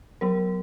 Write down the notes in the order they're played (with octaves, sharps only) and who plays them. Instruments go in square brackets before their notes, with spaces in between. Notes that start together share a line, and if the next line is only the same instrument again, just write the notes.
[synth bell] F#3 B3 A#4